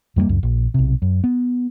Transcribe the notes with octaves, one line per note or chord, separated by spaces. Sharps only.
F2 G3 G#3 A#3
C#2 F#2
A#1
B1 C3
F#2
B3